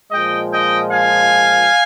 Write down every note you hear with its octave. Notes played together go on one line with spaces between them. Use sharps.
A#2 F3 G#3 D#5 G5
D#5 G5
F5 G#5